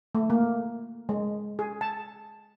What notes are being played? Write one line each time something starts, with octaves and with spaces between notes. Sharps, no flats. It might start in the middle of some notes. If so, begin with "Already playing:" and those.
A3
A#3
G#3
G#4
A5